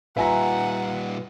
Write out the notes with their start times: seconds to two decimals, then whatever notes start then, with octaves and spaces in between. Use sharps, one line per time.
0.17 A#2 G3 F4 B4 E5 F#5 G#5 A#5